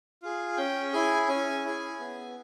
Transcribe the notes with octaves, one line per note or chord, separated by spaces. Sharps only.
F4 G#4
C#4 G5
E4 G#4 G#5
C#4 G#5
E4 G#4
B3